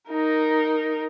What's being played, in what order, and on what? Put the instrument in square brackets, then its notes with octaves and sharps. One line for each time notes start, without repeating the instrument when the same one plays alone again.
[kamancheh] D#4 A#4